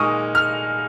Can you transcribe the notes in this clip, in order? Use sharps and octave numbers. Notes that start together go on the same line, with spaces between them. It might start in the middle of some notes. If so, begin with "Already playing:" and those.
Already playing: A#2 G#3 D#4 C#6 D#6 F6
F6